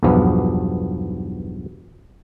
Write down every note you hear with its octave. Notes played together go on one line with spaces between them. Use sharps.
B1 E2 G2 F3 B3